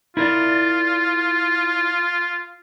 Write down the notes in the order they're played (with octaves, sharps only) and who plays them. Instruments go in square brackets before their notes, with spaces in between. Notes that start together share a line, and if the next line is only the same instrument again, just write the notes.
[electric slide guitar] E4 A#4 D5 [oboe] F4